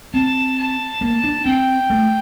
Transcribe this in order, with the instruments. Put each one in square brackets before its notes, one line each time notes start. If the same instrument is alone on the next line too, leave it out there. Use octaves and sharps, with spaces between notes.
[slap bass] C4 [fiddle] A5
[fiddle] A5
[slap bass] A#3
D4
[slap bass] C4 [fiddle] G5
[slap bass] A3